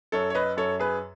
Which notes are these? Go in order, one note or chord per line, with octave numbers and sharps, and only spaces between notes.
F#2 A4 C#5
C#5
B4 D#5
F#2 A4 C#5
G#4 B4